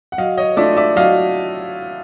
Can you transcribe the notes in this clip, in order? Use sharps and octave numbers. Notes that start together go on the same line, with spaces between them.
F#5
F#3 D#5 F5
C#5 D#5
A3 D4 F4 D5 E5
D5 E5
F#3 D#5 F5